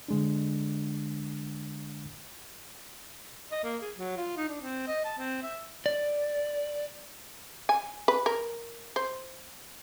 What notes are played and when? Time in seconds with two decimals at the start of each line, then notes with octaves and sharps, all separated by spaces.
0.08 D3 G#3 D4
3.52 D#5
3.64 A#3
3.82 G#4
3.95 F#3
4.17 F4
4.37 D#4
4.49 D4
4.61 C4
4.87 D#5
5.05 A5
5.18 C4
5.43 E5
5.86 D5
7.69 G#5
8.08 B4
8.26 A#4
8.96 C5